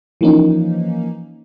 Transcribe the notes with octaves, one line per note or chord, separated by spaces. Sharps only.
E3 F3 A#3 C#4 D#4